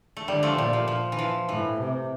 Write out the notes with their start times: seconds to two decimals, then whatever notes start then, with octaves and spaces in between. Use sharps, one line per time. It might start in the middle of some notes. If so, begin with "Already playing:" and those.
0.17 A3
0.28 D3 G3
0.43 F3 A3
0.58 A#2 G3
0.73 F3
0.88 F3
1.12 E3
1.19 F3
1.49 A2 E3
1.79 C3